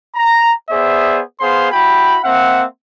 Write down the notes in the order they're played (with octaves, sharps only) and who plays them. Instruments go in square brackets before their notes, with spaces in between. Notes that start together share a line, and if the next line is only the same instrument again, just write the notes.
[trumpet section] A#5
B3 G#4 C5 D5 E5
B3 G#4 C5 F5 C6
E4 F#4 G5 B5
A#3 C4 E5 F#5